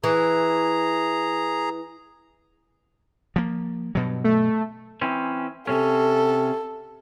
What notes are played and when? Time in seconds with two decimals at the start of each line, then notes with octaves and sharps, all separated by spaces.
0.04 E3 G#4 A#5
3.36 F3 A#3
3.95 G2 B2 F#3
4.24 A3
5.01 E3 C4 C#4
5.67 C3 C#4 A4